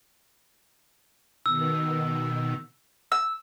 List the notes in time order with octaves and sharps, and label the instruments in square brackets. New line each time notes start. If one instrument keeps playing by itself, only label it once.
[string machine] B2 D#3 [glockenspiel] E6
[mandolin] E6